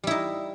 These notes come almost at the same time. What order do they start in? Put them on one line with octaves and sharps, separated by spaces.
G3 E4 D#4